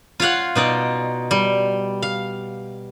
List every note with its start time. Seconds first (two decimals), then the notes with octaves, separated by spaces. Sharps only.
0.20 F4 C#5 F5 F#5
0.55 B2 D#4 D5
1.31 G3
2.02 F5